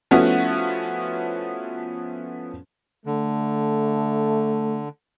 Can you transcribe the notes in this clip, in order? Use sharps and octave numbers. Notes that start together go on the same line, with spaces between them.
F3 A3 B3 C#4 E4 F#4
D3 A3